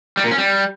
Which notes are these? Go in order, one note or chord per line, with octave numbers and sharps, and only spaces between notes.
G3
A#2
C#4
G3